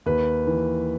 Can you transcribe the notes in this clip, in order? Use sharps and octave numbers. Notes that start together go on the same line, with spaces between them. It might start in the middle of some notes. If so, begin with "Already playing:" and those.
D#2 B4
E3